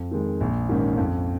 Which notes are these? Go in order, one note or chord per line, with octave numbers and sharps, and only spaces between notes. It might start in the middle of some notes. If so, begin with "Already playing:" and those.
Already playing: F2
D#3 G#3
A#1
G#2 D#3 C#4
F2